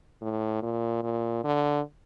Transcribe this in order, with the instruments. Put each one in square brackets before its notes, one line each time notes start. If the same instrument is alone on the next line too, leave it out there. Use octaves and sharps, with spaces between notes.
[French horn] A2
A#2
A#2
D3